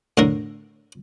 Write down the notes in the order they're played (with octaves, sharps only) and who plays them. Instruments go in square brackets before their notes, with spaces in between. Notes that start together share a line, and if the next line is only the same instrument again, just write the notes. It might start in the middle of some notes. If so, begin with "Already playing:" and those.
[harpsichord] A2 D3 A#4